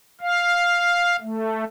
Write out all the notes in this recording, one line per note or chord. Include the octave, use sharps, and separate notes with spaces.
F5
A3